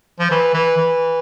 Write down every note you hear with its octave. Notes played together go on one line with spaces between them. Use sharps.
F3
E3
E3
E3